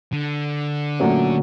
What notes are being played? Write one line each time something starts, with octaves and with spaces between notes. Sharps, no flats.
D3
A#2 F#3 A3 C#4